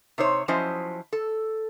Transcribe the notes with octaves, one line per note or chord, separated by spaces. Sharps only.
C3 D#4 C5 C#5
F3 F#3 C#4 E4 C5 D#5
A4